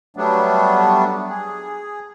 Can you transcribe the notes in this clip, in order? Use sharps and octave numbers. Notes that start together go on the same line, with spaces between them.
F#3 G3 A3 B3 D4
G#4